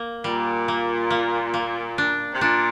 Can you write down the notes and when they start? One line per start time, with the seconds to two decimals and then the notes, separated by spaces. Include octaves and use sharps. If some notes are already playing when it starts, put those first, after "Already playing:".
Already playing: A#3
0.24 A#2 G3
0.68 A#3
1.10 A#3
1.54 A#3
1.98 D4
2.33 C3
2.41 A#2 D4